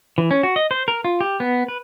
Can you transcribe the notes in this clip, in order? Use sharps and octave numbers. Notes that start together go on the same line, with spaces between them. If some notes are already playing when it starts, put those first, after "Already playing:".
E3
C#4
F#4
D#5
C5
A#4
F4
G4
B3
B4